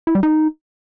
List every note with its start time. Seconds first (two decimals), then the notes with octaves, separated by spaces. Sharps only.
0.07 E4
0.15 G3
0.23 D#4